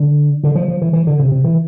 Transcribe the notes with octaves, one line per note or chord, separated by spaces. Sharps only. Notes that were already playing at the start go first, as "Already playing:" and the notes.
Already playing: D3
D3
F3
F3
E3
E3
D3
C3
C3
E3